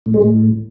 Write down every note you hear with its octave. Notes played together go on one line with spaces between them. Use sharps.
A2
G#3
A2